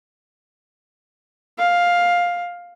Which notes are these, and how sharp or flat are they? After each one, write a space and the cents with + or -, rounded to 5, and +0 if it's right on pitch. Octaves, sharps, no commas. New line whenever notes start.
F5 +10